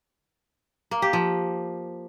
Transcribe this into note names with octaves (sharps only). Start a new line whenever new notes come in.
A#3
G4
F3